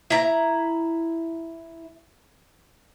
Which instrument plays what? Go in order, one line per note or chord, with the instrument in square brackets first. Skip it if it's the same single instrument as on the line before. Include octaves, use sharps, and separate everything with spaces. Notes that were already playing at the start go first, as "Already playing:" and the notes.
[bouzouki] E4 A#5